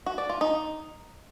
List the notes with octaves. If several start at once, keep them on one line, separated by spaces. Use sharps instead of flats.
F#4
D5
F4
D#4